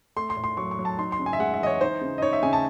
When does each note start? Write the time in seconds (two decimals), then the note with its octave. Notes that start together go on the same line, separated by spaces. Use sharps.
0.16 A3 C6
0.30 C6
0.37 A2
0.44 C6
0.57 F#3 C#6
0.71 C#6
0.79 F#3
0.85 A5
0.98 D#4 C6
1.12 C6
1.19 C#3
1.26 G#5
1.33 E5
1.39 G#3 F#5
1.54 E5
1.60 E3 D#5
1.67 C#5
1.81 D#4 C5
2.01 C#3
2.18 D#5
2.22 D#4 C#5
2.33 E5
2.43 C#3 G#5
2.53 A5